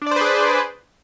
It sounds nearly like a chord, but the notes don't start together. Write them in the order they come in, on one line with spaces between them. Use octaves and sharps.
D4 D5 C5 B4 G#4